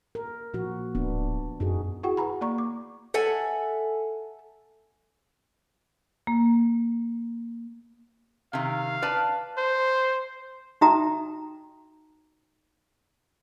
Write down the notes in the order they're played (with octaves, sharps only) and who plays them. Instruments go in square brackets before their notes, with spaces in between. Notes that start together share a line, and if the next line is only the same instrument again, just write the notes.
[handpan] A#4
A#2 F3 F#4
[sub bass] D1 [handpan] B3 D4
[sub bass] F#2 [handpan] D#4 F#4 G#4
[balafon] E4 F#4 G#4 F#5 G5 C#6
B4 F#5 G#5 A#5 B5
A#3 D5 A#5 C#6
D6
[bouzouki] A4 E5 F#5 G#5
[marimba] A#3
[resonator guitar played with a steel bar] C3 D#3 [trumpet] F5
[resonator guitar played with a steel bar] B4 D5 A5
[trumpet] C5
[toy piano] D#4 F#4 E5 G5 A#5 D#6